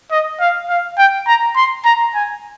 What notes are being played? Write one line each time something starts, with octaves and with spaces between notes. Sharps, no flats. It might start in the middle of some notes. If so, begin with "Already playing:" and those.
D#5
F5
F5
G5
A#5
C6
A#5
G#5